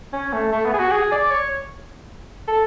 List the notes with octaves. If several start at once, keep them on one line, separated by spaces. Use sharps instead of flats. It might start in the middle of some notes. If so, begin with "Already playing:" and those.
C#4
A3
A3
B3
G#4
F#4
G#4
D5
C#5
A4